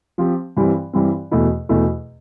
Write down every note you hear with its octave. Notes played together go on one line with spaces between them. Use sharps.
F3 C4 G4
G2 E3 G3 C4
G2 E3 G3 C4
E2 B2 A3 E4
E2 B2 A3 E4